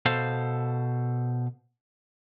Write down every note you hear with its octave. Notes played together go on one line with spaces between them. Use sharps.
B2 A4 C5 F5